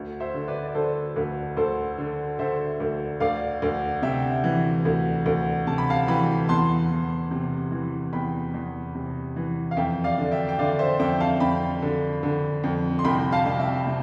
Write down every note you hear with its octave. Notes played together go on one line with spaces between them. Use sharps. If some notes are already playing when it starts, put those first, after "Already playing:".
Already playing: D2
C5 E5
D3
B4 D5
D5
D3 A4 C5
D2 B4
D2 A4 C5
D3
D3 C5 E5
D2
D2 D5 F5
D2
C3 E5 G5
E3
D2
D2
C3 A5
B5
F5 A5
E3 G5 B5
E2 A5 C6
E2
C3
E3
E2 G5 B5
E2
C3
E3
F5
F2 E5 G5
D5 F5
D3
E5 G5
G5
D3 D5 F5
C5 E5
F2 E5 G5
F5 A5
F2 G5 B5
D3
D3
F2
C6
C2 G5 B5
F5 A5
C2
E5 G5
C3